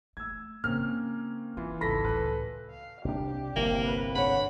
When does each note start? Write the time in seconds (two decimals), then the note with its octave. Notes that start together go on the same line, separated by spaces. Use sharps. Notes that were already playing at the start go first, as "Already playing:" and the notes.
0.17 A3 E6 G#6
0.64 C#3 A#3 C4 C#4 F6
1.57 E3 C4 F4
1.81 G#1 C#2 A4 B5 A#6 B6
2.05 C#2 A2 B4
2.71 F5
3.05 C2 D4 G4
3.56 G1 C2 A#3 C4
3.85 B4
4.15 D3 C#5 F#5 B5